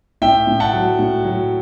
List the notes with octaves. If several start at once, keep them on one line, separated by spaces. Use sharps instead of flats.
A2 E5 G5
A2
F#5 A5
F#3
A2
F#3